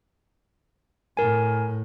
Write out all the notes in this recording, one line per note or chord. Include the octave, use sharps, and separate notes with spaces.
A2 A#4 G#5